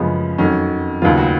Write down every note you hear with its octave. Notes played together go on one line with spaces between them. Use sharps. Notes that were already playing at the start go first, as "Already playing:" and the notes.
Already playing: F#2 C#3 F3 G#3 B3
F2 D#3 F#3 C#4
D#2 C#3 F#3 B3 F4
F#4